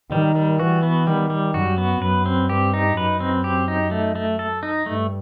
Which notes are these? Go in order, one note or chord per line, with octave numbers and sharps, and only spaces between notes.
D#3 G3
G3
E3 F#4
B3
D#3 G3
G3
F#2 F#4
B3
F#2 B4
C4
G2 G4
D#4
F#2 B4
C4
G4
D#4
A3
A3
A4
D#4
G2 A3